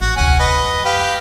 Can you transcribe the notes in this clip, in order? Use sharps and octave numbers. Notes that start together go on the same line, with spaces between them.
A1 G#2 F#4
F1 D2 C#4 F#5 G#5
B4 D#5
F#2 G#3
G4 B4 F5